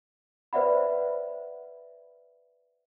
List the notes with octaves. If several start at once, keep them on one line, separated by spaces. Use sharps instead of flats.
B4 C5 D5 E5 F#5 B5